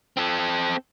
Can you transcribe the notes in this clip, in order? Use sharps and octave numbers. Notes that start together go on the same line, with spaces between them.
C4 A4